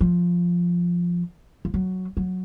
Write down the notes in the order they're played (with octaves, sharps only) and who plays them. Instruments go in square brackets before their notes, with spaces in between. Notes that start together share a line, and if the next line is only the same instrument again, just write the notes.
[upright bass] F3
F3
F#3
F#3